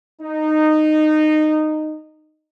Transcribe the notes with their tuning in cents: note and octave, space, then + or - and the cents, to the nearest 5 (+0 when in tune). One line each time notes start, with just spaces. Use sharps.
D#4 -15